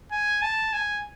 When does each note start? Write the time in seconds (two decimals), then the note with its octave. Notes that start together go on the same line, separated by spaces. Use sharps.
0.12 G#5
0.42 A5
0.73 G#5